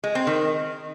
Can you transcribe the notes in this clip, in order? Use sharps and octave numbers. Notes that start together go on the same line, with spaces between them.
G#3
C4
D#3